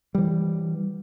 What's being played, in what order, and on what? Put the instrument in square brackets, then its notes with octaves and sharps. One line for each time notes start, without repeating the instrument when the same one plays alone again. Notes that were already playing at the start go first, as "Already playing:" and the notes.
[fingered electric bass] E3 G3